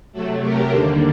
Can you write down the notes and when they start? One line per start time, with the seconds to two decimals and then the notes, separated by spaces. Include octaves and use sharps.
0.12 C3 F#3 A3 F#4 A4
0.40 G4 A#4
0.69 D#2 D3 G3 A#3 A4 C5